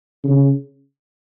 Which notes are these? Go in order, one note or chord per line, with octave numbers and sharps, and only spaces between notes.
C#3